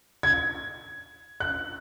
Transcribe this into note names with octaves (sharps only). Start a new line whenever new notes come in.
G#6
F#6